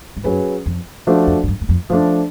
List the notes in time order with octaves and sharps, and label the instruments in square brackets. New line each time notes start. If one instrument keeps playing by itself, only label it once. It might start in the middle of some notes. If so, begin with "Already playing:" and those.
[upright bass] G#2
[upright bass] F#2 [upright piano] F#3 C#4 G#4 B4
[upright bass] F2
[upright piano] F3 A3 D4 F#4
[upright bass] F2
G#2
F#2
F#2
F2
[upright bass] F#2 [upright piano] F3 A3 D4